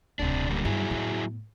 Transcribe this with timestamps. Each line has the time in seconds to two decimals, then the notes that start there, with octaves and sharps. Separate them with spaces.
0.19 D1 B1 C3 D4
0.49 D3 G3 A#3
0.65 G2 F#3 E4 G#4
0.91 A2 B3